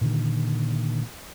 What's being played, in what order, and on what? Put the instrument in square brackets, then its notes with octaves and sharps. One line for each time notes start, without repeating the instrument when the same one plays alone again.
[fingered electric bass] A#2 D3 D#3